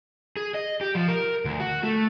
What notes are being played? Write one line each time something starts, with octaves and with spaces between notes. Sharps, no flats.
G#4
D#5
G4
F3
A#4
D2
F#4
A3